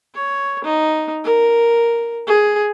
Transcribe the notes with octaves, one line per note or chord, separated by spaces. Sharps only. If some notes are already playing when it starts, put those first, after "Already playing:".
C#5
D#4
A#4
G#4